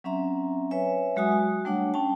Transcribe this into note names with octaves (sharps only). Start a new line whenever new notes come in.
F#3 C4 C#4 E5 A#5
B4 C#5 E5 G#5
F#3 G#3 F#4 G#5 D#6
F#4
G3 A3 D4 C#5 F#5
C#4 G5 A5